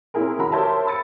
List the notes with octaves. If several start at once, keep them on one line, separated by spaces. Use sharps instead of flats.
A#3 C4 C#4 E4 G#4 A#4
D#3 F#4 A#5 B5
G4 A#4 C5 C#5 E5 A5
B5 E6 A6 C#7